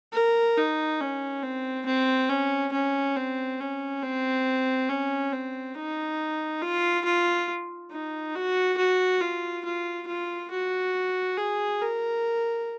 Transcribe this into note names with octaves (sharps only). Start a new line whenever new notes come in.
A#4
D#4
C#4
C4
C4
C#4
C#4
C4
C#4
C4
C#4
C4
D#4
F4
F4
D#4
F#4
F#4
F4
F4
F4
F#4
G#4
A#4